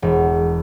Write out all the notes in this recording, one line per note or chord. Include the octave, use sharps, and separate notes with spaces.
E1